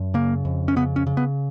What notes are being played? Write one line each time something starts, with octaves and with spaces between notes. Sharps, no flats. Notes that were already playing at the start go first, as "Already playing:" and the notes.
Already playing: F#2
C#3 A#3
F2
C#4
C#3 B3
C#4
C#3
B3